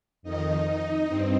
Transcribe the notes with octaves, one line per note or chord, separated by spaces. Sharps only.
F2 D#3 D#4 D#5
D#4 D#5
G2 C4